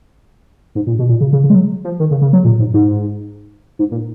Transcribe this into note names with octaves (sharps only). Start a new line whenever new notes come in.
G#2
A#2
B2
A#2
C#3
C#3
C#3
G#3
F#3
F3
D#3
C#3
C#3
F#3
A#2
G#2
G#2
G#2
A#2